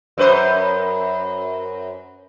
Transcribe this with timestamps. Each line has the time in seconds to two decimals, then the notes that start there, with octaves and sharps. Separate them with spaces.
0.18 F#2 B4 C5